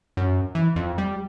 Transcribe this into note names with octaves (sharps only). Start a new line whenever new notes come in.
F#2
E3
F2
G3